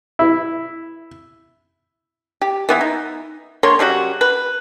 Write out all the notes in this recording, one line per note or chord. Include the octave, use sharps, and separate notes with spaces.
E4
G4
E3 B3 E4
D#4
D3 A#3 C#5 C6
C#3 F#3 G3 F#4
B4